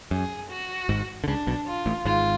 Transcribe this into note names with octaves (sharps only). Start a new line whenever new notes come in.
F#2 G#4
F#4
G#1 G#2
D3
C#2 C#3 D4
B1 B2
F4
A1 A2
G#1 G#2 F4